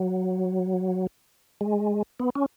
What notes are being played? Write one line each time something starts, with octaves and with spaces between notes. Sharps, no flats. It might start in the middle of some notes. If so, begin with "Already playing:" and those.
Already playing: F#3
G#3
B3
C#4